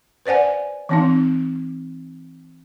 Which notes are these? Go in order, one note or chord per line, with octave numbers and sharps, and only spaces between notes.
B4 C5 D5 F#5 G#5
E3 C4 D#4